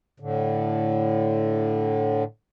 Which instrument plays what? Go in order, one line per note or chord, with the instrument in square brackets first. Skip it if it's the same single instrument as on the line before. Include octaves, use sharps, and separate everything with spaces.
[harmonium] A2 D3